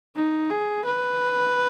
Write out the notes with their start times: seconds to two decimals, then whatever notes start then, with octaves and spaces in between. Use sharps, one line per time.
0.16 D#4
0.50 G#4
0.85 B4